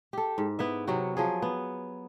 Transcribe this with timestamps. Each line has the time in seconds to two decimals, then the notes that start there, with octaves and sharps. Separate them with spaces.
0.13 G4 A4
0.38 G#2
0.59 B3 E4 E5
0.87 C3 F#3 B3 F#4
1.17 F3 F#3 G#4
1.42 B3